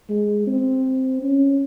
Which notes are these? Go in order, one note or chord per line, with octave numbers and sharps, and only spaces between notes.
G#3
C4
C#4